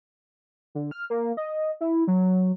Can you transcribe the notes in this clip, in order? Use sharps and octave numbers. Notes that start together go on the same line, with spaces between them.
D3
F6
A#3
D#5
E4
F#3